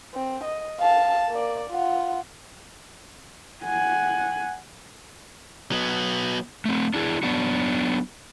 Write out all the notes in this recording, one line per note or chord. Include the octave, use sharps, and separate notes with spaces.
C4
D#5
F5 A5
A#3 D5
F4 F#5
F#5 G#5
F#3 B3
A3 C4
D4 E4 G#4
F#3 B3 D4 F#4